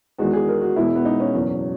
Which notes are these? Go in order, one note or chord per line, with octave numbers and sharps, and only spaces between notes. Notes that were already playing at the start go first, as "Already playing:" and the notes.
E2 D#3 G#3 F#4
G#4
A#4
F#4
E1 E2 B2 G#3 E4
B3
D#4
C#4
F#1 E2 B2 F#3